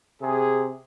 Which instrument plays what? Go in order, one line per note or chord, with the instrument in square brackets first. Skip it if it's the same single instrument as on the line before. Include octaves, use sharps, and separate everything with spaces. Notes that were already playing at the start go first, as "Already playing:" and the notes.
[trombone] C3 [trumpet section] G#4